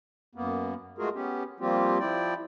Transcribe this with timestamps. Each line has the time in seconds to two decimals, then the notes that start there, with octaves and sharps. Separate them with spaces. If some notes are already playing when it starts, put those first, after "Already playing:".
0.35 F#2 A#3 B3
0.98 G#3 A3 F4 F#4 G#4 A#4
1.14 B3 C#4 G4
1.60 F3 G3 A#3 C4 F4 G4
2.00 F3 E4 D5 G5